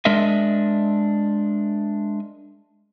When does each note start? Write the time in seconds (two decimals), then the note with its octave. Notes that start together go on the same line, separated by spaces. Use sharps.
0.05 G#3 D4 A#4 D#5 E5